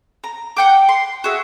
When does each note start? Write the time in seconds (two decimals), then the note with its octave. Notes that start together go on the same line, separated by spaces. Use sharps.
0.24 A#5
0.57 F#5 G5 D6
0.89 C6
1.24 F#4 G#4 E5